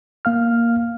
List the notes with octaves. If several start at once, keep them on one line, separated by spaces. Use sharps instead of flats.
A#3 F5 F6